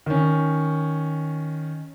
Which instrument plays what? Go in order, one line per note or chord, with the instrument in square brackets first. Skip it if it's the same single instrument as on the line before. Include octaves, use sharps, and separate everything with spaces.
[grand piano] D#3 C#4